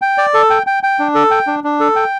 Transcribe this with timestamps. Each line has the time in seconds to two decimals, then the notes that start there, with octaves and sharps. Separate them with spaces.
0.02 G5
0.18 D5
0.34 A4
0.50 G5
0.67 G5
0.83 G5
0.99 D4
1.15 A4
1.31 G5
1.47 D4
1.64 D4
1.80 A4
1.96 G5